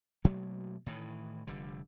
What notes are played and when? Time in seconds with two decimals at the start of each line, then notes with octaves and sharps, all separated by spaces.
0.24 B2 F#3 A3 A#3
0.86 A2 D#3 E3
1.47 F1 D3 G3